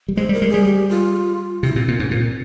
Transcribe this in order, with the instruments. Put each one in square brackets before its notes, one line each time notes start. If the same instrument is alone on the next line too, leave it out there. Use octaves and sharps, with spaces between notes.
[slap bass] G3
[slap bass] G#3 [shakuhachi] C5
[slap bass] G3 [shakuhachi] A#4
[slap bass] G#3
[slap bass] G3 [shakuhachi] G#4
[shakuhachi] G4
F4
[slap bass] C3 [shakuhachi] E4
[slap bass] A#2 [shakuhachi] C4
[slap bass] A#2 [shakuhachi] A#3
[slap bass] G#2 [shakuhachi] C#4
[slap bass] A#2 [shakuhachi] C4